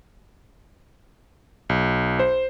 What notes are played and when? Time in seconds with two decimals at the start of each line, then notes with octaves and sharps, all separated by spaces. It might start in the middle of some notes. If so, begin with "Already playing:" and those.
1.69 B1
2.19 C5